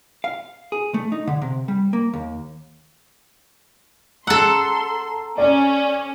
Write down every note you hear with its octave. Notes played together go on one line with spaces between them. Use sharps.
F5
G#4
A3
D#4
D3
C3
G3
A#3
D#2
A4 F#5 A#5 C6 E6
C#4 D5